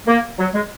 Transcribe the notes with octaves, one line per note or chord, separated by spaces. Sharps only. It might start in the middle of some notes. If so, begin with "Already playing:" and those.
A#3
F#3
G#3